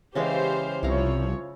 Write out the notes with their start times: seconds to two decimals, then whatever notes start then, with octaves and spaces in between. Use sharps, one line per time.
0.15 C#3 E3 G#3 G4 C5 F5
0.83 C2 F3 E4 C#5 F5 A#5